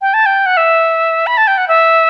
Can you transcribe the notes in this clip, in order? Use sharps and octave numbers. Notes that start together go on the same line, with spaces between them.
G5
A5
G5
F#5
E5
B5
A5
G5
F#5
E5